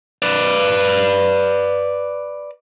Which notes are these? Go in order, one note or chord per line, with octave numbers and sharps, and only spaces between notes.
B4 D5